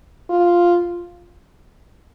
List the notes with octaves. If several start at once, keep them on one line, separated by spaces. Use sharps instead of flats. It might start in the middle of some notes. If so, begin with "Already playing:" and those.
F4